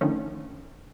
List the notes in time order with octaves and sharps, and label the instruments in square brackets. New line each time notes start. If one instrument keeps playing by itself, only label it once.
[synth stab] D3 D#3 F3 A3 C#4